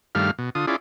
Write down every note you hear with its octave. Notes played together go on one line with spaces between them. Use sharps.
G2 D#3 G3 A3 F5 F6
B2
D3 F4 D#6
C#4 E4 F4 G#4 D5